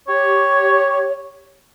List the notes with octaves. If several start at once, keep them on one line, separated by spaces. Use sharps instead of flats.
G4 C#5